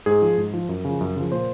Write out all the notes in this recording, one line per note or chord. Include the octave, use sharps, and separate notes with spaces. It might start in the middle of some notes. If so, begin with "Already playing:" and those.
G#2 G#4
F3
G#2
F3
F#2
C#3 F3
F#2
C#3 F3
A#2 C5